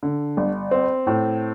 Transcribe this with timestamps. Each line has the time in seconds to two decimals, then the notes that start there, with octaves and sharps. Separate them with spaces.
0.03 D3
0.37 G1
0.71 C4
1.07 A2